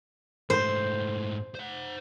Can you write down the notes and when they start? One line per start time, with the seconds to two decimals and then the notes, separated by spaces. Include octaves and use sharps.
0.50 G#2 A3 C5
1.55 C5 F#5